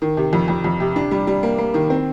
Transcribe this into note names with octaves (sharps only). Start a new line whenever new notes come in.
D#3
C3
F2
F2
F2
C3
D4
G3
G3
A#3
A#3
D#3
C4